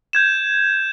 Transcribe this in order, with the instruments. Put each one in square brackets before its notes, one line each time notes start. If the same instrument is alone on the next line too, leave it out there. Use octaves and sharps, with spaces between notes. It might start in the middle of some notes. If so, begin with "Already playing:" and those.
[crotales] G6 G#6 E7